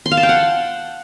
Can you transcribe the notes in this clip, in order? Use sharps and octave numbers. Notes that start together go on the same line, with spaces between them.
C6
F5
A5
G5
F#5